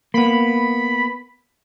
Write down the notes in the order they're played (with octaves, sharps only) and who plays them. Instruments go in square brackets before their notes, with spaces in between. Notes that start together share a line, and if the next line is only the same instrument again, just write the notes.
[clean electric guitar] A#3 B3 [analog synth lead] B5